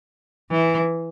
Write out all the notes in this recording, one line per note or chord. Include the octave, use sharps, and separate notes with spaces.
E3